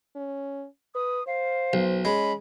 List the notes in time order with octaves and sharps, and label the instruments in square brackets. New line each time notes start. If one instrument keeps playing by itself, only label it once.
[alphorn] C#4
[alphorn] B4 [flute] D#6
[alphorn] C5 [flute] F5
[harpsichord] B1
[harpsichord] G#3 [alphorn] C#4 [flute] B5